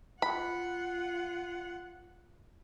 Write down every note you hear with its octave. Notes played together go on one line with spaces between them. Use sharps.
F4 F#5 B5